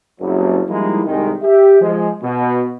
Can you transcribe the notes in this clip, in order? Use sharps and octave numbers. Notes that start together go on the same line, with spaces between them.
F#1 C2 F#3
F3 G3 G#3 A#3 D#4 E4
C2 D#3 G#3
G4 E5
F3 G#3
B2